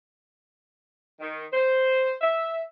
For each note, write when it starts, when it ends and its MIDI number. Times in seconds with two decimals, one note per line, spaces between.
1.20 1.44 51
1.53 2.13 72
2.22 2.62 76